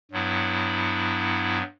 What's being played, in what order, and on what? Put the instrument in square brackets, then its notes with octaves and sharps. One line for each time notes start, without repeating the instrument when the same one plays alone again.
[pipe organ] G2 F#3 B3 E4